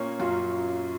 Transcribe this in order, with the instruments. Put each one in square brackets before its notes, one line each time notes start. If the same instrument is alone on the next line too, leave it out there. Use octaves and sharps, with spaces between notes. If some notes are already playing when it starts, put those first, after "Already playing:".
Already playing: [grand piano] A#2 A#3 [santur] C#4
[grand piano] F#2 F#3 [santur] F4